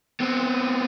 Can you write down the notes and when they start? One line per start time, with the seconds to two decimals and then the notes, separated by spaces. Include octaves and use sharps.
0.20 B3 C4